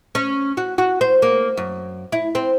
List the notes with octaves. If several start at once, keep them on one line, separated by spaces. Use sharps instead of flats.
C#4
F#4
F#4
C5
A#3
F#2
E4
C4